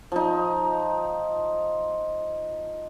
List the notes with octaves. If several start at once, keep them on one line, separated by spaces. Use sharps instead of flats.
F3 D#4